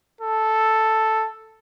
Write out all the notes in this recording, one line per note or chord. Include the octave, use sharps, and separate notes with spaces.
A4